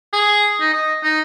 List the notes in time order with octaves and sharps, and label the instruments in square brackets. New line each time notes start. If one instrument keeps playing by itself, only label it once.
[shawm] G#4
D#4
D#5
D#4